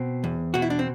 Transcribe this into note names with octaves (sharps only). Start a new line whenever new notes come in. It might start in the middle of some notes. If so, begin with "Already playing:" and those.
Already playing: B2 C4
E2
B2 F#4
E4
D4
C4